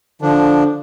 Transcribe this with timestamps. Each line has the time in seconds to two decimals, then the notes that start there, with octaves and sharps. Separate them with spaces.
0.22 D3 F3 D4